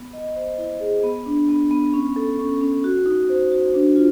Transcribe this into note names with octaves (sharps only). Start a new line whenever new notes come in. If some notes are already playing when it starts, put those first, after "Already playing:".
Already playing: B3
D#5
C5
E4
G#4
B3
D4
B3
B3
C#4
A4
C#4
C#4
F#4
D#4
C5
F#4
D4
F4